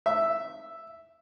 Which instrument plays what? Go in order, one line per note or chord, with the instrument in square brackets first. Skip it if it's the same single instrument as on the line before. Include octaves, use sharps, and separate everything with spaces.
[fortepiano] E5